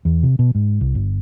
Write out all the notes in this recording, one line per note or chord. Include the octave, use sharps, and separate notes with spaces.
E2
C3
B2
G#2
C2
G1